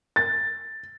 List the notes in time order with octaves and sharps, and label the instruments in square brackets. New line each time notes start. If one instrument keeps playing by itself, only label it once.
[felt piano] A6